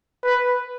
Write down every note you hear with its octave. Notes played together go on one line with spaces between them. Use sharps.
B4